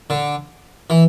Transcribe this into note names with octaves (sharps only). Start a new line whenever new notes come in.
D3
E3